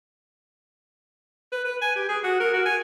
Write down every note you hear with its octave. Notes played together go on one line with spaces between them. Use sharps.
B4
B4
G#5
G4
G#4
F#4
A#4
F#4
G#5